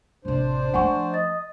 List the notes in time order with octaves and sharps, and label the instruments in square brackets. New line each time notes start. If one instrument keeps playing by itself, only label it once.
[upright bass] A1 C3 [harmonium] D4 C5
[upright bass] F3 A3 [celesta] F#5 G#5 C#6
[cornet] D#5 [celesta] A6